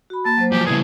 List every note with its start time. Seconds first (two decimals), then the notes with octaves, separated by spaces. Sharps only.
0.10 F#4 B5
0.25 A#3 A5
0.37 F#3 A#3 C5
0.52 F3 F#3 G4 G#5
0.66 C#3 G3 A3 B3 E4 G#4